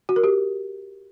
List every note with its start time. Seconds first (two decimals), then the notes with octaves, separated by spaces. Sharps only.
0.09 F#4
0.16 A#4
0.24 G4